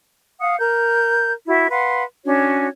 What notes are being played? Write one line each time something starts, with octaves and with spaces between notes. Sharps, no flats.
F5 F#5 D#6
A#4 G6
E4 F#4 E5
B4 F5 F#5 C6
C#4 D4 F#4 C#5